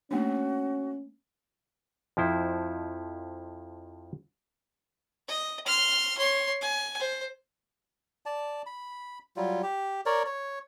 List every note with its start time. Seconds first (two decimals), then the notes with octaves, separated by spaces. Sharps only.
0.11 A3 A#3 C#4 D4 F#4
2.17 F2 F3 E4 C5
5.28 D#5
5.66 C6 F6
6.18 C#5 C6
6.61 G#5
6.99 C5
8.26 D5 A5
8.66 B5
9.36 F#3 G3 F4
9.63 G4
10.06 A#4 C#5 D5
10.26 C#5